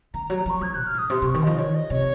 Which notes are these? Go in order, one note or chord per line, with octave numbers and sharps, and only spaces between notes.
D#3 A#5
A#5
F#3
A#5
F3 C#6
F3 G#6
A#2 F#6
F6
G#2 D#6
C3 C6
C3 C#6
D#3
F3 D#5
D#3 C#5
D#5
C3 C#5